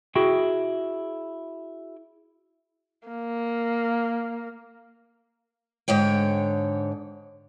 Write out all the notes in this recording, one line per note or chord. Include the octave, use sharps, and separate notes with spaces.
E4 F#4 G#4 G5
A#3
G#2 D3 C#5 G5